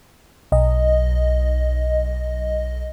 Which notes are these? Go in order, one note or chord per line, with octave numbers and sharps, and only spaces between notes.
B1 D#5